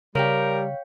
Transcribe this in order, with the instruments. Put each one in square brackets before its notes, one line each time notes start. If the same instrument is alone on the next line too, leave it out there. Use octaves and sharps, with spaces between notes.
[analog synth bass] C#3 [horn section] G3 [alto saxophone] A#4 [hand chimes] C#5 F5 G5